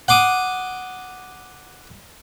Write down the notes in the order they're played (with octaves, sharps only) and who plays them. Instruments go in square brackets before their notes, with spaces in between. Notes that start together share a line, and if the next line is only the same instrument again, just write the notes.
[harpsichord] F#5 C6 D6 D#6